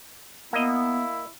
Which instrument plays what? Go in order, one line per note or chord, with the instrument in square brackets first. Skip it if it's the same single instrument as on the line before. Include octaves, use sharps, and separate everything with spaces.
[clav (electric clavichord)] A#3 D#5 [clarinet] B3 [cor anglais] E4